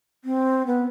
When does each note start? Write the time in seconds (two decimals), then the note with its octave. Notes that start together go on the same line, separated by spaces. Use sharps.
0.24 C4
0.67 B3